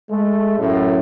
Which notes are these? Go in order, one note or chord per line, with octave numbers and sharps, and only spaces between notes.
G#3 A3
F#2 A2